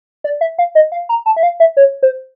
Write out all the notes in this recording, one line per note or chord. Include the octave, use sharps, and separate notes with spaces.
D5
E5
F5
D#5
F5
A#5
A5
E5
F5
E5
C#5
C5